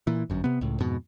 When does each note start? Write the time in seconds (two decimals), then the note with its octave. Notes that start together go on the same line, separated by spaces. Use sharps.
0.07 A#2 E3
0.30 G1 F#2
0.44 C3 B3
0.61 C#2 A2
0.80 F2 G#2 B2